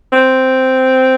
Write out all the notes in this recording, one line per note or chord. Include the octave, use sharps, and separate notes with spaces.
C4